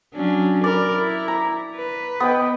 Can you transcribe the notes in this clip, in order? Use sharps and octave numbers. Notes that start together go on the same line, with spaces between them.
F#3 C#4 D4
A#4 D5 B5
E4
A#5
B4
B3 D#5 G5